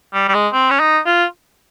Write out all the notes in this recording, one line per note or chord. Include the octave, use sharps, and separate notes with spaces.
G3
G3
G#3
C4
C#4
D#4
F4